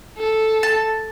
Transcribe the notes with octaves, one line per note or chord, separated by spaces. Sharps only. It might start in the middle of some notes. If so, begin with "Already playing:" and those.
A4
A5